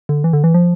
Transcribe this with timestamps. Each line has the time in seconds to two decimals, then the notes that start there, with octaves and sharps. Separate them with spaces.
0.09 D3
0.24 E3
0.33 D3
0.44 E3
0.54 F3